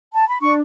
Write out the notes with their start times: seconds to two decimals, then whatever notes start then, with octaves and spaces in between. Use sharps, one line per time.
0.14 A5
0.28 B5
0.41 D4 C#6